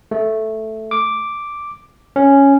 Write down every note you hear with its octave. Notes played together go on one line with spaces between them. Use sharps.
A3
D6
C#4